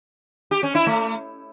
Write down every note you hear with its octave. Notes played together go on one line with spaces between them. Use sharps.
G4
C#4
E4
A3